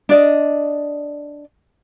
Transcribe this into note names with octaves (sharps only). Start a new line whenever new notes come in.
D4 D5 D#5